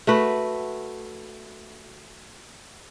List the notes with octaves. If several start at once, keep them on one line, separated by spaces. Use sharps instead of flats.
A3 F#4 B4